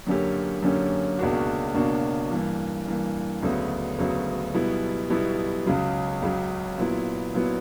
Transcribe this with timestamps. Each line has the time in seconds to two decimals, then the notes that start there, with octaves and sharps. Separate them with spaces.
0.07 F#2 D3 A#3 C#4 G4
0.62 F#2 D3 A#3 C#4 G4
1.18 C#2 B2 A#3 D4 F#4
1.74 C#2 B2 A#3 D4 F#4
2.30 G2 E3 A#3
2.86 G2 E3 A#3
3.42 D2 C#3 F#3 B3
3.98 D2 C#3 F#3 B3
4.54 B1 B2 G3 B3 E4
5.10 B1 B2 G3 B3 E4
5.66 C#2 C#3 F#3
6.22 C#2 C#3 F#3
6.78 A#2 F#3 B3 E4
7.34 A#2 F#3 B3 E4